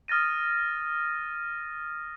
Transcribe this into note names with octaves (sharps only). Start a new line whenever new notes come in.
D#6 F6 A6 A#6 D#7